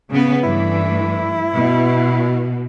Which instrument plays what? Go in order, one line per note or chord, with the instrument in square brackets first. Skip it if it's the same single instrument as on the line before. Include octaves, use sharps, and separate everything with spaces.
[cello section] C#3 B3
[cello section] G2 E3 A3 [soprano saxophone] E4
[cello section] B2